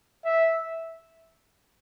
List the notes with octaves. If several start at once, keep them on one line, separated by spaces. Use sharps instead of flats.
E5